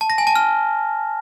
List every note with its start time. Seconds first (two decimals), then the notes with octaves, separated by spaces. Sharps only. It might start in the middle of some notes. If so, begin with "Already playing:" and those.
0.01 A5
0.10 A#6
0.18 G#5
0.27 A5
0.36 F6